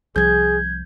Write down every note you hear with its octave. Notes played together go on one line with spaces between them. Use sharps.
C2 F3 G#4 G6 G#6